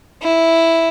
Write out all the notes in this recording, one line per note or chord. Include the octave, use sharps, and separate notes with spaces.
E4